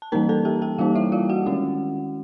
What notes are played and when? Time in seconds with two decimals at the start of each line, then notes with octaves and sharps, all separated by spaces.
0.02 A5
0.12 E3 G3 A#3 D#4 A#4 A#5
0.29 A4 A5
0.45 G4 G5
0.62 G4 G5
0.78 E3 G3 A#3 D#4 F4 F5
0.95 E4 E5
1.12 F4 F5
1.29 F#4 F#5
1.46 D#3 G#3 C#4 E4